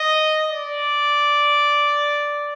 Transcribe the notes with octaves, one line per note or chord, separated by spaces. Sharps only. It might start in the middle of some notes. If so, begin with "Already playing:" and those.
Already playing: D#5
D5